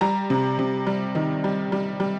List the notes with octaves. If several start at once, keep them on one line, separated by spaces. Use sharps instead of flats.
G3 A#5
C3
C3
G3
D#3
G3
G3
G3